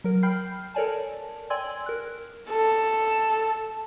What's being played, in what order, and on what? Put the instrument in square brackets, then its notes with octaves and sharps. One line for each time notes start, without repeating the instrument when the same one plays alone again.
[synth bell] F#3 A#4
G5 B5 F6 G6 C7
A4 A#4 C#5 D5 G#5 A5
D5 G5 G#5 C6 E6 G#6
A#4 F#6
[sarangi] A4